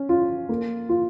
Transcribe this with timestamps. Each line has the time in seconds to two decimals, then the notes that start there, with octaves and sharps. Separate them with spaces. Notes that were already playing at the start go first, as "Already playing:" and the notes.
Already playing: C#4
0.09 F4
0.49 A#3
0.89 F4